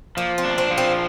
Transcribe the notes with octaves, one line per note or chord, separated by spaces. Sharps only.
F3 A#3
C4
D4
C4
F3
C4